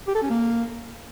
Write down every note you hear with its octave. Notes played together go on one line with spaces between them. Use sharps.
G4
A4
C#4
A#3